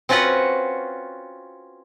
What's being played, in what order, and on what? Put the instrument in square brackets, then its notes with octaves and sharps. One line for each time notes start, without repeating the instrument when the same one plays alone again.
[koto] C4 C#4 F4 F#4 B4 F#5